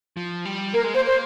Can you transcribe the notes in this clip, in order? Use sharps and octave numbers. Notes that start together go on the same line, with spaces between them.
F3
G3
A#3 A#4
G#3
A#3 C5
C5